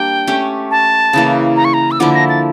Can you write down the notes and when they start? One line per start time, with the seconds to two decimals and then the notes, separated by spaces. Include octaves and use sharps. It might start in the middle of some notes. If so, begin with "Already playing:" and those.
Already playing: G3 A#3 D4 G4 G5
0.27 A3 C#4 G4
0.71 A5
1.13 C#3 E3 A#3
1.56 A#5
1.65 C#6
1.74 A#5
1.91 E6
2.00 D3 F3 A#3 E4 D6
2.14 A#6
2.29 A6